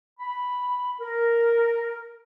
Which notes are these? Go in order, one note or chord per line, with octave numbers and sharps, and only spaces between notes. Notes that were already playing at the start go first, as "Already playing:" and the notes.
B5
A#4